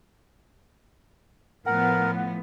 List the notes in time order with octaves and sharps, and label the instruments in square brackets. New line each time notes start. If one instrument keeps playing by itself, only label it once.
[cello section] A2 F3 B3 [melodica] A#4 [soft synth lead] F#5